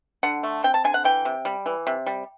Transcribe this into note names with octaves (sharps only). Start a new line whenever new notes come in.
D3 F#5
A3
C4 G5
A5
D3 G#5
F#5
E3 G5
C3
G3
E3
C3
G3